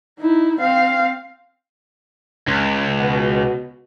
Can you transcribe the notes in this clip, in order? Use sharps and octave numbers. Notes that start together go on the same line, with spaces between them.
D#4 E4
C4 F5
C#2
B2